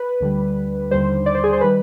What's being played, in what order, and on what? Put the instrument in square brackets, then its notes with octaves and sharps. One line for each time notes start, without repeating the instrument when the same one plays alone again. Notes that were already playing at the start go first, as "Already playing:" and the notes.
Already playing: [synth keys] B4
D2 D3 G3
D#2 D3 G3 C5
D5
C5
G#4
C5
D#3 G3 B4